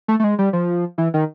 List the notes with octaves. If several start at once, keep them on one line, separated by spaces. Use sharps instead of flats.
A3
A3
G#3
G3
F3
E3
D#3